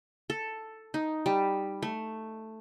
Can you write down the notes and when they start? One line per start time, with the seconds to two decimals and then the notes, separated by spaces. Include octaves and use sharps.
0.30 A4
0.94 D#4
1.26 G3
1.82 A3